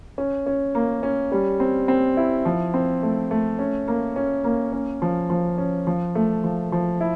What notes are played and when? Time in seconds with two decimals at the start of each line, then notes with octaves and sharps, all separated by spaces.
0.18 C#4
0.46 C#4
0.75 A#3
1.03 C#4
1.32 G3
1.60 C4
1.88 C4
2.17 E4
2.45 F3
2.74 C4
3.03 A3
3.31 A3
3.59 C#4
3.88 A#3
4.16 C#4
4.44 A#3
4.73 C#4
5.02 F3
5.30 F3
5.58 C#4
5.87 F3
6.15 A3
6.44 F3
6.72 F3
7.01 E4